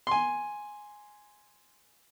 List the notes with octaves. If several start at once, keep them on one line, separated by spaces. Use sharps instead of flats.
G#5 C6